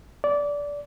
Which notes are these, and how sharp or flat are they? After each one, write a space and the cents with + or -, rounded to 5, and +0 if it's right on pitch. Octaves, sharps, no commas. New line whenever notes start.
D5 -20